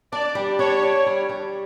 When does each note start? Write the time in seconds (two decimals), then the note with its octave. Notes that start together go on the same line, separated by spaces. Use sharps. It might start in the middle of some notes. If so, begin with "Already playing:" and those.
0.12 D4 D5
0.35 G3
0.59 D4 C#5
0.83 D4
1.06 G3
1.29 G3